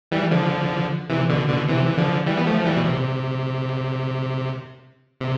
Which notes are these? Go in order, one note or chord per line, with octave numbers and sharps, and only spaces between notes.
E3 G3
D3 F3
C3 E3
B2 D3
B2 D3
C3 E3
E3
D3 F3
E3 G3
B3
F3 A3
F3
E3 G3
B2
C3
C3